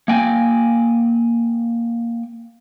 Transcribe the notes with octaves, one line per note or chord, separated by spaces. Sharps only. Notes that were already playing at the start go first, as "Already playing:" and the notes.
A#3 G5 G#5